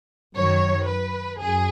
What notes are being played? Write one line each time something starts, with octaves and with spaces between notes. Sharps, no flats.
F#2 D#3 F#3 C#5
B4
F#2 G#4